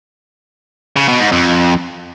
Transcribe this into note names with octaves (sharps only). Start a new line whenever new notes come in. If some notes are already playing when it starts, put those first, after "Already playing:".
C#3
B2
G#2
F2